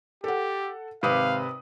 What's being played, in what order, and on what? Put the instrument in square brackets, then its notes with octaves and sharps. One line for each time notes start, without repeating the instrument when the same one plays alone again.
[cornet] G4 [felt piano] A4 F#5
[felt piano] G#1 D#6 [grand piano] C3 B4 D6 [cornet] F5